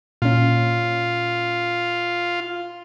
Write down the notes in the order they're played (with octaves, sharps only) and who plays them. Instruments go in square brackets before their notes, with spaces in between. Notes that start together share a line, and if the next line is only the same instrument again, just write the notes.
[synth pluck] A#2 C#4 [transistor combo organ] F4